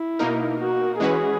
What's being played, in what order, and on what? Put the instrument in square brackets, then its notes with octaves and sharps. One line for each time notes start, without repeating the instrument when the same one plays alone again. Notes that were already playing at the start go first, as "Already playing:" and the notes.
Already playing: [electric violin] E4
[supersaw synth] B2 A#3 D#4 A#4
[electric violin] F#4
[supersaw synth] E3 G#3 C#4 F#4 B4 [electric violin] G#4